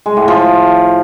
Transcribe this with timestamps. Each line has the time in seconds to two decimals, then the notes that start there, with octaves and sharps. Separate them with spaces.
0.06 G#3
0.17 A2
0.28 F3